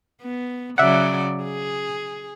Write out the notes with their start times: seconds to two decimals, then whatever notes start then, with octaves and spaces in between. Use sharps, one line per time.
0.22 B3
0.78 C#3 F#3 D5 E5 F#5
1.44 G#4